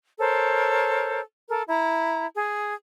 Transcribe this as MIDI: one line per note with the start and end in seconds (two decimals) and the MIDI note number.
0.19 1.21 69
0.19 1.21 70
0.19 1.21 72
0.19 1.21 73
1.49 1.63 69
1.49 1.63 70
1.68 2.26 64
1.68 2.26 82
2.36 2.73 68